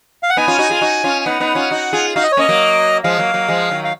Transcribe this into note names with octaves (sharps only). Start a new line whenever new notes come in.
F5
F#5
B3 D#4 G#5
C#4 F4
D#4 F#4
F4 G#4
D#4 F#4
C#4 F4
G#5
B3 D#4 F#5
B3 D#4
C#4 F4
D#4 F#4
F4 G#4
D#4 F#4 F5
D#5
C#5
A#3 C#4 D#5
F#3 A#3
F3 G#3 F5
F#3 A#3
F#3 A#3
F3 G#3
D#3 F#3
F5